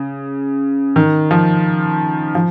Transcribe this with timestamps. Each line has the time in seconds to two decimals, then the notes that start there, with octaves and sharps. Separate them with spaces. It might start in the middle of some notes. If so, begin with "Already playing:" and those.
Already playing: C#3
0.96 D#3
1.31 F3
2.35 F3